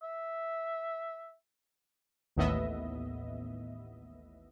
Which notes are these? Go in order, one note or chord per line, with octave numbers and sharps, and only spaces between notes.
E5
A1 D#2 A2 B3 D#5 E5